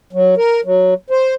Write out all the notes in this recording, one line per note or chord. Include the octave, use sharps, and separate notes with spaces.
F#3
A#4
F#3
C5